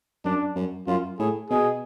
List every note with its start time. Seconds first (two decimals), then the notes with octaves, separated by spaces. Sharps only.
0.25 F#2 D4
0.56 F#2
0.87 F#2 F4
1.19 A2 G#4
1.50 B2 G#4